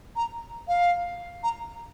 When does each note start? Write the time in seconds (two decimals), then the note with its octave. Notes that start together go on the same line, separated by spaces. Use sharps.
0.16 A#5
0.68 F5
1.43 A#5